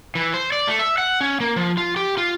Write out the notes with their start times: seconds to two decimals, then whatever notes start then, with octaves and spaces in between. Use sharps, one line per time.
0.15 E3
0.34 C5
0.52 D5
0.68 A3
0.79 E5
0.98 F#5
1.21 C#4
1.40 A#3
1.56 F3
1.77 F4
1.96 G4
2.17 F4